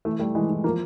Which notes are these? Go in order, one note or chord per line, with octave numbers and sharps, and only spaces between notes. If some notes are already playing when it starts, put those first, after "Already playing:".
E3 A3
G3 A3
E3 G#3
E3
F3 A#3